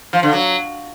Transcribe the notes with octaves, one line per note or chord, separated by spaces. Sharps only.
F3
D3
F#3